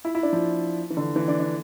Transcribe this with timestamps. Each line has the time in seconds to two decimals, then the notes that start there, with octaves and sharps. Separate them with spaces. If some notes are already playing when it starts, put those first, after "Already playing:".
0.05 E4
0.15 E4
0.23 D4
0.33 F3
0.90 E3
0.97 D3
1.16 E3
1.28 D4
1.40 D4